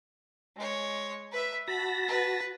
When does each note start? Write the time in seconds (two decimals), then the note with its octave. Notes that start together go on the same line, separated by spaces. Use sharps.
0.56 G#3 C#5
1.32 B4 E5
1.68 F#4 A5 B5 A#6
2.08 B4